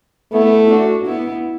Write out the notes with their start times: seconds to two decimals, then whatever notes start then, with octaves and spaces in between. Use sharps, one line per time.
0.32 A3 B3 E4
0.70 D4 F#4
1.06 B3 E4